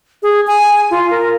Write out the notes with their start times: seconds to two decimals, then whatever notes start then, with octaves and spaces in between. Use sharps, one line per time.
0.22 G#4
0.47 G#5
0.90 F4
1.10 A#4